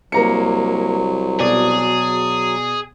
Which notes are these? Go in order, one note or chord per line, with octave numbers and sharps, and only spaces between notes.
C2 F#3 A#3 A#5 C#7
B2 G#4 D5